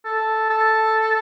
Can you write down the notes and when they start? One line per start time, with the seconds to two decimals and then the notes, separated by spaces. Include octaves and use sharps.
0.05 A4
0.50 A4